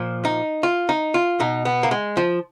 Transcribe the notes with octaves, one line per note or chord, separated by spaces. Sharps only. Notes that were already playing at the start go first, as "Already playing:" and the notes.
Already playing: A#2 F3
D#4
F4
D#4
F4
B2 D#4
B3
A#3
G#3
F3